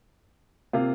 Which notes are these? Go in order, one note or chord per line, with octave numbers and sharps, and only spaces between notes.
C3 A#3 F4